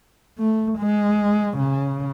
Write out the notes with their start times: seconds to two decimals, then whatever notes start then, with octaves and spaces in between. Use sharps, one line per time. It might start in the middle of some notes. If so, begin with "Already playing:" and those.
0.38 A3
0.78 G#3
1.58 C#3